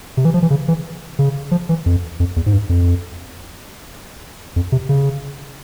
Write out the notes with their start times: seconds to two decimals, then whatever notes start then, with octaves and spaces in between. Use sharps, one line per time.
0.17 C3
0.25 E3
0.34 F3
0.42 E3
0.50 C#3
0.68 E3
1.19 C#3
1.51 F3
1.69 E3
1.86 F2
2.20 F2
2.36 E2
2.46 G#2
2.53 G2
2.69 F2
4.56 F2
4.72 C3
4.89 C#3